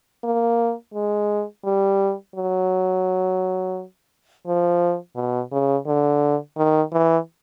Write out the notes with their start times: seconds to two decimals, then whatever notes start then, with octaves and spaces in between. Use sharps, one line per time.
0.24 A#3
0.94 G#3
1.64 G3
2.36 F#3
4.47 F3
5.16 B2
5.52 C#3
5.87 D3
6.57 D#3
6.93 E3